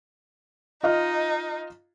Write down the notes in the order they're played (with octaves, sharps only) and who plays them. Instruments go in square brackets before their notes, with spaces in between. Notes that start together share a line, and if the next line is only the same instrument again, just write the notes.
[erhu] D#4 [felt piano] F4 D#5 F6